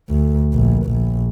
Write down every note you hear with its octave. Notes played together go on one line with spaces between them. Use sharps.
D2
A#1
A#1